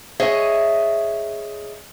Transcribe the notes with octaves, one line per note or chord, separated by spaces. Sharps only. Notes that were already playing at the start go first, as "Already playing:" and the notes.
G#4 C#5 D#5 E5